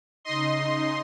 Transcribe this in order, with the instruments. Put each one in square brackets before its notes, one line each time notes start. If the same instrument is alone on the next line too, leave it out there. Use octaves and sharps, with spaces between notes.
[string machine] C#3 D#4 [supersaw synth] D#5 C6